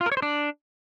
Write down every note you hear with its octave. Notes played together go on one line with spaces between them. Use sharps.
F4
A#4
C#5
C5
D4